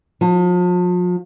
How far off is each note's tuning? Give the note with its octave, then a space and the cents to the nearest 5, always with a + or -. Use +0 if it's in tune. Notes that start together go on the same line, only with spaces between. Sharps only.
F3 +40